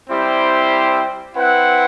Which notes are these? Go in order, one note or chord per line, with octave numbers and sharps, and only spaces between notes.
G3 C4 E4 G4 C5
C4 E4 B4 F#5